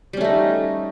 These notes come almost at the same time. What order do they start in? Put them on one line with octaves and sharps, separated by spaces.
G3 C#4 A3 D#4